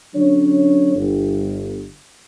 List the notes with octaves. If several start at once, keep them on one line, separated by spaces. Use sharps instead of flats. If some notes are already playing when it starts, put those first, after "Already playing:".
D3 F#3 C#4 D4 C#5
G1